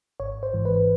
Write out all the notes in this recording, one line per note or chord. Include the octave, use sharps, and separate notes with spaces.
G#1 C#5
C5
G#2 E3
B4